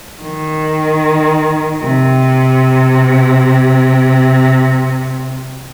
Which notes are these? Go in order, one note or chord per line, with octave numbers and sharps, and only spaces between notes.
D#3
C3